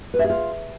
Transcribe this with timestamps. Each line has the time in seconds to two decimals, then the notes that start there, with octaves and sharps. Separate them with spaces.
0.14 B4
0.19 E5
0.24 G#4
0.30 F4